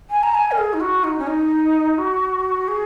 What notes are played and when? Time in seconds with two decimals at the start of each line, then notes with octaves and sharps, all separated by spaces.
0.10 G#5
0.23 A#5
0.34 G#5
0.51 A#4
0.58 G#4
0.73 D#4
0.80 F#4
1.04 D#4
1.19 C#4
1.27 D#4
1.98 F#4
2.68 G#4